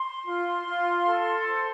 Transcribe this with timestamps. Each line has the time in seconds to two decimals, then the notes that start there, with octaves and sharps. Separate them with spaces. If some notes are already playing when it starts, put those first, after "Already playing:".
Already playing: C6
0.24 F4
0.66 F4
1.05 A4
1.45 C5